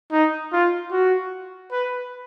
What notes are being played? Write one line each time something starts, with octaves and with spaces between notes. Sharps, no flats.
D#4
F4
F#4
B4